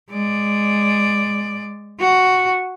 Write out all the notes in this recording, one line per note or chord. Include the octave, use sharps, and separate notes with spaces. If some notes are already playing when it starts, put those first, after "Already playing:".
G#3 D5
F#4